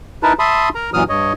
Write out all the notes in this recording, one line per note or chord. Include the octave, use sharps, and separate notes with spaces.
D#4 E4 A#4 B4 A5
E5 A5 B5 C6 D#6
A#4 A#5
F#2 A#2 E3 F#3 D#6 F6
G2 C#5 D#5